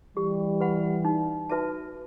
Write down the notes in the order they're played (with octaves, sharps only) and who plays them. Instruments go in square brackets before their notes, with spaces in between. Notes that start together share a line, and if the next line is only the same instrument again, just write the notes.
[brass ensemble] E3 G3 [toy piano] G4
[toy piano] B4 F#5 B5
D#4
F#4 B4 E5 A5